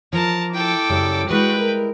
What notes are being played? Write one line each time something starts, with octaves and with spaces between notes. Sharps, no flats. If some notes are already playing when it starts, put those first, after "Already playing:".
F3 A#4 A5
E4 A4 G5 D6
F#2 C#3 G3
G3 G#3 E4 F#4 B4 G5
A#4